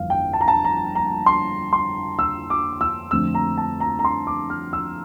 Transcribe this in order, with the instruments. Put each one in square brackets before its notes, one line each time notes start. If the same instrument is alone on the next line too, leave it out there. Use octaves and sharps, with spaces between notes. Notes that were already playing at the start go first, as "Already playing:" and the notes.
Already playing: [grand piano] G1 F2 E3 F5
G5
A5
A#5
A5
A#5
A#5
C6
C6
E6
D6
E6
F2 D3 A3 C4 E6
A#5
A5
A#5
A#5
C6
D6
F6
E6